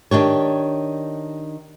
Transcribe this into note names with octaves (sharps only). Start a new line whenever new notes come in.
D#3 D4 G4 C#5